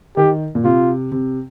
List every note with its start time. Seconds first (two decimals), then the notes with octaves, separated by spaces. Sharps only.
0.17 D#3 G4
0.55 A#2
0.64 C3 F4
1.12 C3